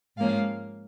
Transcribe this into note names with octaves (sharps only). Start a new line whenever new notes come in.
G#2 F3 A#3 C#4 F5